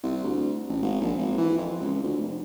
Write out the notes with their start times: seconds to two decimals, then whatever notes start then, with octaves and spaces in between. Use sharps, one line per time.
0.03 C2
0.24 D2
0.69 A1
0.82 G#1
1.01 A#1
1.18 G#1
1.38 E3
1.58 F2
1.80 C#2
2.03 D2
2.21 F1